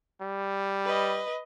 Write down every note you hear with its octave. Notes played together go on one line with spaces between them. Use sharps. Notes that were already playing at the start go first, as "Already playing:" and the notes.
G3
B4 D#5